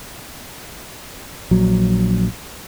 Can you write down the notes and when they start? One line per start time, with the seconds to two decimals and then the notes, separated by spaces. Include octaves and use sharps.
1.51 A#1 F#3